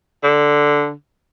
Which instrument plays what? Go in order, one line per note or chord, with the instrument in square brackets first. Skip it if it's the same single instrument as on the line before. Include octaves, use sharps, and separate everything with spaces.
[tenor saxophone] D3